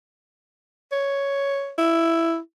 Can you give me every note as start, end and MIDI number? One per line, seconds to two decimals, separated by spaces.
0.92 1.72 73
1.78 2.37 64